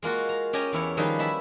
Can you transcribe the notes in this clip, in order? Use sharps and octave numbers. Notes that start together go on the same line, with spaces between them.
G#3 A#3 F4 F#4
A#5
C#4 G4 D#5 G#5 A#5
E2 E4 C#5
D#3 F3 G3 D#4 G#4 B4
E4 E5 A5 B5